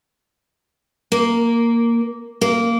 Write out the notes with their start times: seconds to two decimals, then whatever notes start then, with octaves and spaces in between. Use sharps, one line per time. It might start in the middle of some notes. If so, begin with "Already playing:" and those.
1.12 A#3
2.41 A#3